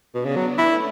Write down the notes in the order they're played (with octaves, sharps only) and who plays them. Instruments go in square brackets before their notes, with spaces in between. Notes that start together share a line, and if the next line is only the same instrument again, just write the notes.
[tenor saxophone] B2 [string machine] B3 D4
[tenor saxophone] C#3
F#3
[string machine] A3 C#4 [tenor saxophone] E4